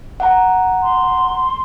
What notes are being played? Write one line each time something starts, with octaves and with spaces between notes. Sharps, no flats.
F#5 A#5
C6